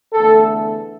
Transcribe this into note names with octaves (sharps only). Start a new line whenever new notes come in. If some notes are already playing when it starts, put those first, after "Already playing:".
E2 D3 A3 A4